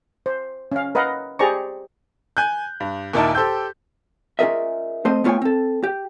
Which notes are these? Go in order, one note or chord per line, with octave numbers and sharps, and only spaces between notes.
C5
C#4 F5
A#4 B4 D#5 F5 F#5
G4 G#4 C5 D5 A#5 C#6
G#5 F#6 G6
G2
D#2 A#2 A#3 D#4 E4 A5
G4 A4 C5 G5 E6 G6
C#4 F4 G#4 A#4 D#5 E5
A3 C4 C5 D#5
A3 B3 F4 C#5 G5 G#5
C4 A4
G4